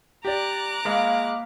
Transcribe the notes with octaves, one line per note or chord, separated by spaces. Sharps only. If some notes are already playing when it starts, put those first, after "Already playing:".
G4 D5 A#5 D6 F#6
G#3 A#3 F5 B5